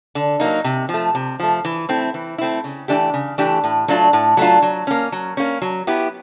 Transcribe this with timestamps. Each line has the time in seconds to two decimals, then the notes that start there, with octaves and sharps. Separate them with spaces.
0.15 D3
0.40 F#3 A#3 D#4
0.64 C3
0.89 F3
0.94 A3
1.15 C3
1.40 F3 A3
1.65 E3
1.89 A3 C4 E4
2.14 E3
2.38 A3 C4 E4
2.64 C#3
2.88 E3 A3 D4 G4
3.14 C#3
3.38 E3 A3 D4 G4
3.64 A2
3.88 F#3 A3 D4 F4
4.13 A2
4.37 F#3 A3 D4 F4
4.62 F#3
4.87 A#3 C#4
5.12 F#3
5.37 A#3 C#4
5.62 F#3
5.87 B3 E4 G4